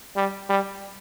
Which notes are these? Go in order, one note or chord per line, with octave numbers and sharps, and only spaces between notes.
G3
G3